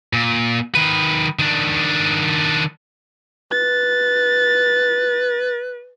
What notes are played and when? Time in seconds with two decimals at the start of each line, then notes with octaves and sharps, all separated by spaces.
0.13 A#2
0.75 D#3 B4
1.39 D#3 D4
3.51 B4 A6